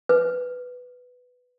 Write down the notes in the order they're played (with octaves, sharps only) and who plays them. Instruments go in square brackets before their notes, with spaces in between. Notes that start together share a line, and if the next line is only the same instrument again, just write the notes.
[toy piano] B4